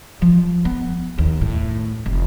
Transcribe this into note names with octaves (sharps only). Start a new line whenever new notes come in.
F3
B3
D#2
A2
F1